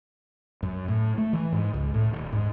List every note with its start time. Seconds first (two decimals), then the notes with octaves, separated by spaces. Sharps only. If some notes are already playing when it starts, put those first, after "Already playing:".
0.63 F#2
0.88 A2
1.18 A3
1.33 E3
1.52 G#2
1.74 C#2
1.94 A2
2.13 D#1
2.32 G#2